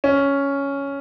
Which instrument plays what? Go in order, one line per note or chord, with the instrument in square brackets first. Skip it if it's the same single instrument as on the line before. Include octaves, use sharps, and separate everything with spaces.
[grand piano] C#4